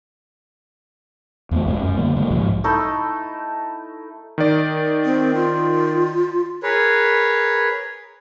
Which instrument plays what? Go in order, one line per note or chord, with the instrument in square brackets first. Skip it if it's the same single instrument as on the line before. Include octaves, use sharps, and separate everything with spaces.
[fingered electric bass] E2 E3 A3
F#1 B1 G#3 C#4
F#2
D3 G3 A#3
C#3 G#3 A#3
B1 G#2 F3
[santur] A3 D#4 E4
[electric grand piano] D#3 D5
[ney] C4
F4
[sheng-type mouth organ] G#4 A#4 B4 C#5